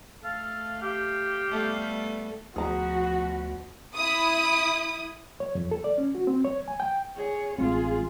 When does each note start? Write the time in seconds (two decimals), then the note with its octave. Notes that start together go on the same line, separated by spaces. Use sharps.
0.24 A3 A4 F5
0.82 G4 F5
1.49 G3 A3 B3
2.56 D2 B2 F3 F#4 G#4 A#5
3.95 E4 D#6
5.40 C#5
5.55 F2
5.71 A4
5.84 D5
5.98 C#4
6.15 F#4
6.27 C4
6.45 C#5
6.68 G#5
6.80 G5
7.17 G#4 C#5
7.58 A1 G#3 C4 F4 G#4